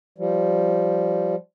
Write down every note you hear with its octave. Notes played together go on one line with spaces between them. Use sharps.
F3 G3